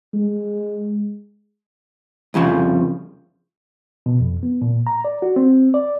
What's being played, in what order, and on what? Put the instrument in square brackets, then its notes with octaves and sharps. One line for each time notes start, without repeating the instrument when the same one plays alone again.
[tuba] G#3
[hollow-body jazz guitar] C2 F2 C#3 F3
[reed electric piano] B2
F2
B3
A#2
A#5
D5
F#4
C4
D5